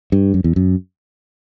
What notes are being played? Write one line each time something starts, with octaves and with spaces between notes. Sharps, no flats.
G2
F#2
E2
F#2